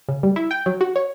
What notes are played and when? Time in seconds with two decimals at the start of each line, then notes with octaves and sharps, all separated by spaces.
0.08 C#3
0.23 G3
0.36 E4
0.51 G5
0.66 F#3
0.81 F#4
0.96 C#5